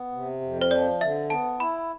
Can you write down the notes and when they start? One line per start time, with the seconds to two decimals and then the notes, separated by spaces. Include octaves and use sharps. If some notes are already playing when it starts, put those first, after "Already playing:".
Already playing: B3
0.12 C3
0.41 F2
0.62 C5
0.71 F3 D5
1.01 D3 E5
1.30 B3 A5
1.60 E4 B5